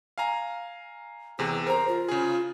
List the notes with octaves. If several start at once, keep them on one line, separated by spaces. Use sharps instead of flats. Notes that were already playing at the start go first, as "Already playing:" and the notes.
F5 G#5 A#5
E2 C3 G#4
A#4 C5 A#5
F4
C#3 G#4